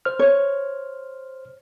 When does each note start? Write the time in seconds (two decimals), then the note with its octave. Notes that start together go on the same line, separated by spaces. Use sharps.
0.05 C5 F6
0.19 C#5